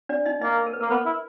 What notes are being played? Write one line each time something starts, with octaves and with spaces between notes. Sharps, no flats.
D4 D5
D#4 D#5
A#3 D#4 D#5
A#4
B4
A#3 A#4
B3 B4
E4